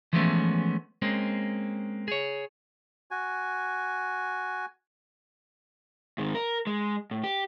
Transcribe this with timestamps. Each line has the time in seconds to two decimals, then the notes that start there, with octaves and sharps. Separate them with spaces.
0.13 E3 F3 G#3 A3 B3 C#4
1.02 G#3 A#3 C4 C#4
2.08 G#4 C#5
3.11 F#4 G#5
6.18 G#2 D#3
6.35 A#4
6.67 G#3
7.11 A2
7.24 G4